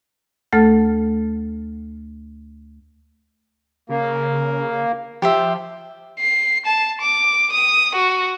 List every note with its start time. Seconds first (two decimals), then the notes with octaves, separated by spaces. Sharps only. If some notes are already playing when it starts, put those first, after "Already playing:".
0.52 D2 A3 A4 F#5 F6 A6
3.90 C#3 A#3
5.22 F3 G4 C5 E5
6.19 C7
6.66 A5
7.02 D6
7.52 D#6
7.95 F#4